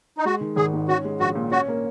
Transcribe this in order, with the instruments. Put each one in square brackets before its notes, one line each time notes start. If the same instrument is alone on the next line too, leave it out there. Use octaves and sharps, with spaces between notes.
[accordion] D#4
[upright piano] G#3 [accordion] F#4
[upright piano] D#3
[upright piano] G#1 [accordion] G#4
[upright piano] G#2
[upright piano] C#4 [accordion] F#4
[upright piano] G#3
[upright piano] A#1 [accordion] F#4
[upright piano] A#2
[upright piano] C#4 [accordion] F#4
[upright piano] A#3